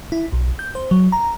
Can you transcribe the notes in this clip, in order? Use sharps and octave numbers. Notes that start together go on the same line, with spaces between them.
E4
B1
G6
C5
F#3
A#5